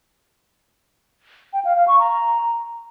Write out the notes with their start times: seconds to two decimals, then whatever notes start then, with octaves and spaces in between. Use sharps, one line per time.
1.53 G5
1.65 F5
1.76 F5
1.88 C#6
1.99 A#5